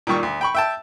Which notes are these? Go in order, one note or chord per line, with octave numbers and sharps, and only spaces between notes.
A#2 D#3 G3 C#6
D2
G5 B5 C#6
E5 G5 A5